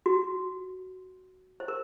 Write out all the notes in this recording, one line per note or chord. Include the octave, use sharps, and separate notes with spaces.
F#4
C5
A#4